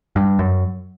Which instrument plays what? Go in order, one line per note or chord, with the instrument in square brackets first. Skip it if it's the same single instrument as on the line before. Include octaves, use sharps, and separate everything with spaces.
[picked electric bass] G2
F#2